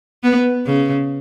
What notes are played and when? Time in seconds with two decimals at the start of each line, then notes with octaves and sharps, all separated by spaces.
0.24 B3
0.66 C#3